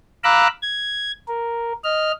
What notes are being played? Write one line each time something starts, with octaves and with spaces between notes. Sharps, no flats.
F5 A#5 B5 D6 E6 F#6
G#6
A#4
D#5 F6